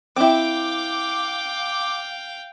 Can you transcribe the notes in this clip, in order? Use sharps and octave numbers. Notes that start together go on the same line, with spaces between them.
C4 E4 F5 G5 D6